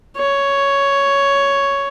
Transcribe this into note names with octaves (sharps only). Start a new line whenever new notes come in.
C#5